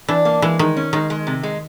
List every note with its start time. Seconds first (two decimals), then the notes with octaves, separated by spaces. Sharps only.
0.08 E3 D4
0.25 A#3
0.42 E3 G#3
0.59 D#3 G#3
0.77 C#4
0.93 D#3 G#3
1.10 G#3
1.27 C3
1.43 G#3